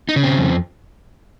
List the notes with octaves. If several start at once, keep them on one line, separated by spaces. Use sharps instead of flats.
D#4
C#3
C4
F2